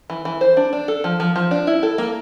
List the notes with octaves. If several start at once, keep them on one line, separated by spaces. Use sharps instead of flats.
E3
E3
C5
D4
D4
A4
F3
F3
F3
D4
E4
A4
A#3